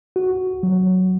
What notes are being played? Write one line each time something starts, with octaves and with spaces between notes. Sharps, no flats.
F#4
F#3